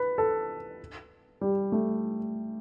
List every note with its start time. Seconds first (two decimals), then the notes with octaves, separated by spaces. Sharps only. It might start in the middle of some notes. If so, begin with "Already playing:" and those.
Already playing: B4
0.18 A4
1.41 G3
1.72 A3